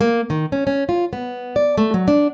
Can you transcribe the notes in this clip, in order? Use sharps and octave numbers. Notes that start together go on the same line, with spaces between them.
A#3
D#3
C#4
C#4
F4
B3
D5
A3
F#3
D4